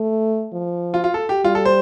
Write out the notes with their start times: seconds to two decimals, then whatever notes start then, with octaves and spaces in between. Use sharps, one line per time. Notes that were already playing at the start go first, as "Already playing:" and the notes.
Already playing: A3
0.53 F3
0.94 F4
1.04 F4
1.14 A4
1.29 G4
1.44 G3 F4
1.55 A4
1.65 C5